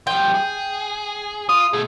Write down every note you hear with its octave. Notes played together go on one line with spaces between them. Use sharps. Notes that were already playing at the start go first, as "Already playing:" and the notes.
F3 G3 G5
G#4
F4 D#6
B2 A3 G#4